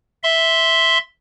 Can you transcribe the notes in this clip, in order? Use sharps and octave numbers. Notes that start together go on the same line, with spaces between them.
E5 C6